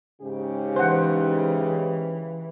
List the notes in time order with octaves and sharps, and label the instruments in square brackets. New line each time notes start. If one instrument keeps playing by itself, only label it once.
[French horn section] G#2 C#3 G4
[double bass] E3 [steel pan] C5 F#5